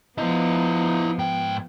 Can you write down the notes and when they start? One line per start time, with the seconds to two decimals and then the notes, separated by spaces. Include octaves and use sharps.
0.18 F3 B3 E4 D#5
1.19 G#2 G5